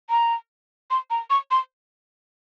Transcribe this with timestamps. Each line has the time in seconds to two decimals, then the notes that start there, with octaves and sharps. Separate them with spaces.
0.10 A#5
0.91 C6
1.10 A#5
1.30 C#6
1.51 C6